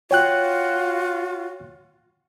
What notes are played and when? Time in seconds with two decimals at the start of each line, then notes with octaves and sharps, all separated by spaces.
0.11 F4 F#4 C#5 G5 F#6